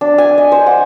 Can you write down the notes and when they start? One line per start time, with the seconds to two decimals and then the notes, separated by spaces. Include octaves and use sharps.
0.01 D4
0.18 G#5
0.38 D#5
0.52 C5
0.66 F#5